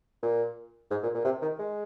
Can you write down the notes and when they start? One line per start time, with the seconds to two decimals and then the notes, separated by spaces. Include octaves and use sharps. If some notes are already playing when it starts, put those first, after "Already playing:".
0.23 A#2
0.91 G#2
1.03 A#2
1.15 A#2
1.25 C3
1.42 D#3
1.59 G#3